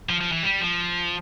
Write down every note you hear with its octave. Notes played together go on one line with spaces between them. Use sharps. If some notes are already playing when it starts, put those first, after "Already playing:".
F3
F3
E3
G3
F3